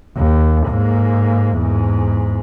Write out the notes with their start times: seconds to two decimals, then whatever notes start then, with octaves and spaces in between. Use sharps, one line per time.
0.17 D#2
0.66 G#2 A#3
1.56 E2 G#2